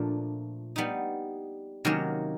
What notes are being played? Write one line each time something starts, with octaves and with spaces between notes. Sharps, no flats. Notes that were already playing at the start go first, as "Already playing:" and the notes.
Already playing: A#2 F3 A3 D4
G3 B3 D#4
C3 D#3 F#3 A#3 C#4